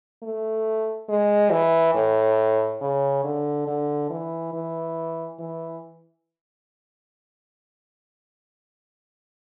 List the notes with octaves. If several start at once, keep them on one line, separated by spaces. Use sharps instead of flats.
A3
G#3
E3
A2
C#3
D3
D3
E3
E3
E3